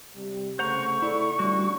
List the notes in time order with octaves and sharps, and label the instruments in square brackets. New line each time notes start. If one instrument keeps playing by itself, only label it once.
[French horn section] C3 G3
[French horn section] C#3 A3 [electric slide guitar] C5 F#5 A#5 [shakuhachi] C#6
[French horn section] A3 D5 [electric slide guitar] E4
[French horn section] D3 A3 C#4 [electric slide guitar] G3 F#4